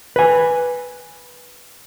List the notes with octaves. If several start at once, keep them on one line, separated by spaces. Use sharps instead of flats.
B4 G#5